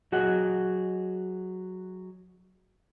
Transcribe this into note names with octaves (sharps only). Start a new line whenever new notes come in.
F#3 F#4 G#4 D#5 F#5